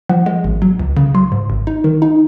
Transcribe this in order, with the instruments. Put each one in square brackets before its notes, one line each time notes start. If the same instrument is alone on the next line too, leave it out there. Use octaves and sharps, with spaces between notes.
[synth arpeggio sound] F3 F#5
G#3
G#1
F#3
C#2
C#3
F#3 C6
G#2
G#1
D#4
D#3
D#4